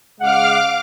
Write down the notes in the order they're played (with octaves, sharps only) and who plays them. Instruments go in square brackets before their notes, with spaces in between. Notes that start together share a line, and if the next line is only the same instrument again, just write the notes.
[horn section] C#3 G#3 F#5 [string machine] F5 D6 F6